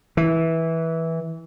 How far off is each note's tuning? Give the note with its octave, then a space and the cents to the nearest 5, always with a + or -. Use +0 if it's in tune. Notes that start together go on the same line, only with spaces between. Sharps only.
E3 -15